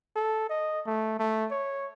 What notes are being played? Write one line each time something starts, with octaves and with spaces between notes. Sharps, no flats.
A4
D#5
A3
A3
C#5